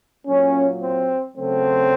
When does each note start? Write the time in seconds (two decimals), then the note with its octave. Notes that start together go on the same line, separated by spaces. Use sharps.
0.26 A#2 F#3 A#3 C#4
0.81 C4
1.37 C#3 F#3 A3 C4